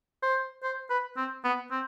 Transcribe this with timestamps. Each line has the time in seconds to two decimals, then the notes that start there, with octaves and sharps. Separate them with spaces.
0.23 C5
0.63 C5
0.90 B4
1.17 C4
1.44 B3
1.71 C4